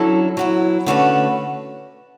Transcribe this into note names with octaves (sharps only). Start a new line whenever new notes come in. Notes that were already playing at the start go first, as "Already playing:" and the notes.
Already playing: D3 F#3 C#4 E4 A4
F#3 B3 E4
D3 A3 C#4 F#4 B4